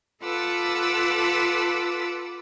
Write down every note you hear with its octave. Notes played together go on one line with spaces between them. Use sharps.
F4 A4 B4 F#5 D6 E6